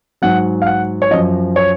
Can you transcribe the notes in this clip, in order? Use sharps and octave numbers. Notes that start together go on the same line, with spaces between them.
G#2 F#3 F#5
F5
F#5
C#5
F#2 F3 D#5
C#5